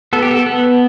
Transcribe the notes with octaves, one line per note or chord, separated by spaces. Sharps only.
B3 A4
G4
A4
B3